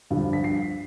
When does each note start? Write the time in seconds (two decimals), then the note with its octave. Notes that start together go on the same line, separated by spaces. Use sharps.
0.11 G2 D3 F3
0.33 B6
0.44 C7